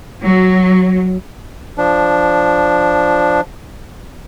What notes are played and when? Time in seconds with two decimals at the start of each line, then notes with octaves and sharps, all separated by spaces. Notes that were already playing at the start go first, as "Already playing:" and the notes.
0.23 F#3
1.78 F3 D4